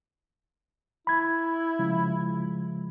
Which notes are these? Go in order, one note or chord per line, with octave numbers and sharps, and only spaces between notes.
E4 B5 G#6
C#3 F3 G#3